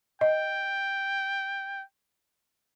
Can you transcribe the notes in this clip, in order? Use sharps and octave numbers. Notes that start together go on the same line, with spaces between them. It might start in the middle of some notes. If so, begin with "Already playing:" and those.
D#5 G5